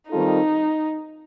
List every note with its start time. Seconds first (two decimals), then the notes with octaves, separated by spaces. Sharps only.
0.10 D#3 G3 C4 D#4 F4 A4